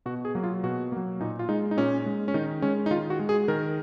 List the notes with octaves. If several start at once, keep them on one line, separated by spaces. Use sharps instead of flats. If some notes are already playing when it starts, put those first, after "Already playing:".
B2 F#4
G#4
F#3 A#3
F4
B2 F#4
F#3 A#3
A#2 D#4
F4
G#3 D#4
D#4
A#2 C#4
G#3
C#4
D#3 D#4
G#3 C#4
D#4
D#3 F4
F#4
G#3
G#4
D#3 A#4